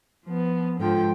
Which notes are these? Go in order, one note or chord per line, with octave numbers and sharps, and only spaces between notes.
F3 B3
G#2 D3 F3 G5